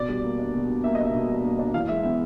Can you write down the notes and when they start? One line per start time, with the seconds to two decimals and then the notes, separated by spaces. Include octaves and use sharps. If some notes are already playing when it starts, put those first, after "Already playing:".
Already playing: B2 D5
0.09 G3
0.24 A#3
0.39 D4
0.54 B2
0.68 G3
0.84 A#3 E5
0.95 D4 D#5
1.05 E5
1.14 B2
1.28 G3
1.44 A#3
1.59 D4
1.74 E3 F5
1.89 G#3 E5
2.03 B3 E5